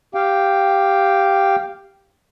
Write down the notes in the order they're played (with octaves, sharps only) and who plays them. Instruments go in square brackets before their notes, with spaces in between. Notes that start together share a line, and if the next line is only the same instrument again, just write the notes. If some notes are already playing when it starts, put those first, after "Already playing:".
[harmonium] G4 F5 G5